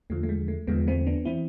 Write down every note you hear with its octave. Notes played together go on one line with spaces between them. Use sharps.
E2 D3 F3 A3
A3
G#3
A3
E2 D3 F3 G#3 B3
A3 C4
B3 D4
E3 C4 E4